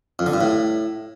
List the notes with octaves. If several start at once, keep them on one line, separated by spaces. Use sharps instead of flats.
F2
D3
G2
A2